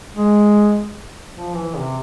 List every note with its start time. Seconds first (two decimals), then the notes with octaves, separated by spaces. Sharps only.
0.15 G#3
1.36 F3
1.56 E3
1.76 C3